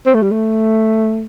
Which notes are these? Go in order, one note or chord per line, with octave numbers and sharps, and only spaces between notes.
C4
A3
G3
A3